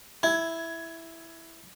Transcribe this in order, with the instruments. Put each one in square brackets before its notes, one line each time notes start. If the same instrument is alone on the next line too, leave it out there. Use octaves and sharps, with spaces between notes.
[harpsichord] E4 [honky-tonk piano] G#6